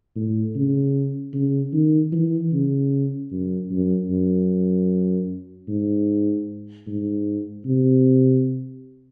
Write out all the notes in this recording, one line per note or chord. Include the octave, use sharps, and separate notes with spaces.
A2
C#3
C#3
D#3
E3
C#3
F#2
F#2
F#2
G#2
G#2
C3